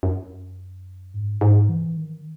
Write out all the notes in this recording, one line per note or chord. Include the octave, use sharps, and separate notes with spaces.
F#2
G#2
G#2
E3
D#3